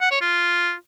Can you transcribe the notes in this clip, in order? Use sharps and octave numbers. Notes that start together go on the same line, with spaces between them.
F#5
C#5
F4